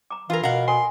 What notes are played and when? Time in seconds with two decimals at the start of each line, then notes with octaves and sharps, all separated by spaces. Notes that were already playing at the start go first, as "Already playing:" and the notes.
0.10 A#5 D6
0.30 E3 F4 A#4 F5
0.43 B2 A#4 F5 F#5
0.68 C#4 A4 G#5 C6